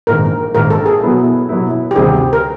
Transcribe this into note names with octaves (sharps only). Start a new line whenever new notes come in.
A#1 G#2 D#3 A#4
A#1 G#2 D#3 A#4
A4
G#4
B2 F#3 B3 E4
B2 F#3 B3 E4
G4
D2 C3 D#3 G3 C4 G#4
A#4